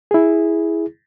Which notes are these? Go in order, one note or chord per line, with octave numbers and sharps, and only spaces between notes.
E4 G#4